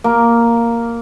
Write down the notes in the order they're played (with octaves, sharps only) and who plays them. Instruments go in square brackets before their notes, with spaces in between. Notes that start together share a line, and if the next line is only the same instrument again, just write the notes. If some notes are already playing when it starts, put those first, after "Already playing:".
[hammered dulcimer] A#3